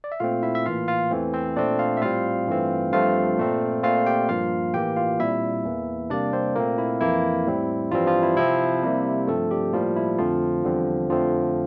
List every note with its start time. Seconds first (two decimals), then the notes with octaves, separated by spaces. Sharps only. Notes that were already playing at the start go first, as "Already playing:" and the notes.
0.04 D5
0.12 E5
0.20 A#2 A3 C4 F4 F5
0.43 E4 E5
0.55 E5
0.66 A2 E3 A#3 F4 F5
0.88 F4 F5
1.11 E2 E3 A3 C4
1.34 C4 C5
1.57 A#2 A3 C4 D4 D5
1.79 F4 F5
1.97 E5
2.02 A2 G3 C4 F4 F5
2.48 G2 E3 A3 C4
2.93 G2 F3 A3 C4 F4 F5
3.38 A#2 A3 C4
3.83 A#2 A3 C4 F4 F5
4.07 G4 G5
4.29 G2 F3 A#3 F4 F5
4.74 A2 E3 A#3 G4 G5
4.96 F4 F5
5.20 A#2 G3 C4 E4 E5
5.65 E2 E3 A#3
6.10 C3 G3 A#3 D4 D5
6.33 C4 C5
6.55 A#2 A3 A#3 C4 A#4
6.78 E4
7.01 F2 E3 A#3 E4
7.47 A2 G3 C4
7.91 G2 E3 F3 G3 C4 F4
8.07 F3 F4
8.23 E4
8.37 C3 F3 C4 E4
8.83 C3 G3 A#3
9.27 G2 F3 A3 C4 A4
9.51 G3 G4
9.73 A2 F3 G3 A#3 F4
9.96 E4
10.18 F2 D3 F3 A3 C4 F4
10.64 E2 D3 G3 C4
11.09 F2 D3 F3 A3 C4 F4